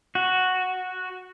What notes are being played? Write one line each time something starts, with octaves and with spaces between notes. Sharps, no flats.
F#4